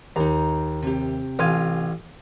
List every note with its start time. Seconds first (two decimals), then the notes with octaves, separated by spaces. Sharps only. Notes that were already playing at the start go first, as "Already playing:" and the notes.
0.16 D#2 D#4 A#5
0.82 C3 G4
1.39 A1 F4 G#5